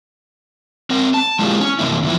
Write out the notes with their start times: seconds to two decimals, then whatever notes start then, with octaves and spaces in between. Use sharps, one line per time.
0.90 C4 A#4
1.14 A5
1.39 G#3 A#3 E4 F4 G4 G#4
1.61 C#4
1.79 C3 E3 A#3 E4
2.03 F2 E3 F3 E4